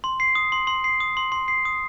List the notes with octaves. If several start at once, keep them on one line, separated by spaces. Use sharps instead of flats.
C6
C7
D#6
C6
C6
C7
D#6
C6
C6
C7
D#6